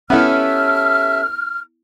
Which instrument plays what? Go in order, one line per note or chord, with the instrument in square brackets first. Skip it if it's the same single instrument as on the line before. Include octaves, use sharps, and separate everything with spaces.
[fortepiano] B3 E4 [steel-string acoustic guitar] C#4 G4 A4 [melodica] E5 [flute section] F6